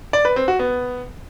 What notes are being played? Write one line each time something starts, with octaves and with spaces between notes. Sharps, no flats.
D5
B4
C4
F#4
B3